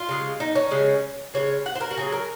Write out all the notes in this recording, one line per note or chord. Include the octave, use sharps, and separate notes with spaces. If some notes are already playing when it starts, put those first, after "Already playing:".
Already playing: F4
C#3 G#3
D#4
C#4
C#3 G#3
C#3 G#3 C#5
F#5
C5
A#4
F#4
C#3 F#3 G#4
A#4